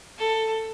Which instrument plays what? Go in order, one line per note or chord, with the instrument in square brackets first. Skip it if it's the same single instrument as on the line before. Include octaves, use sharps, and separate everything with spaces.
[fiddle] A4